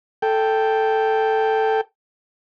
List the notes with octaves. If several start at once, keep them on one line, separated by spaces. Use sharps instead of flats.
A4 G5